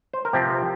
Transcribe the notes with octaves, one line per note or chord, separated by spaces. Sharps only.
C5
A#4
C3 F3 C4 G4